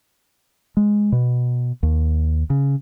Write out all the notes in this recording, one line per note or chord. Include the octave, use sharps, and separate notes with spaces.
G#3
B2
D#2
C#3